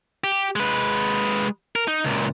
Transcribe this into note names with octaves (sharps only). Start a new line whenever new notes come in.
G4
G#3 B4
A#4
D#4
C#2 A#2